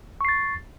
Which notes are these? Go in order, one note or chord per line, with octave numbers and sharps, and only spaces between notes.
C#6 A6 C7